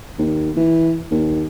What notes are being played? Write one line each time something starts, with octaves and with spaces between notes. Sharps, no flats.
D#2
E3
D#2